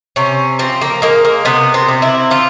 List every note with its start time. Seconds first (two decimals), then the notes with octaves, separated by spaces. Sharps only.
0.16 C3 C#4
0.59 F3 C4
0.82 A#3
1.02 G#3 A#3
1.25 A#3
1.45 C3 B3
1.74 C4
1.88 C3
2.02 E4
2.31 F3 F4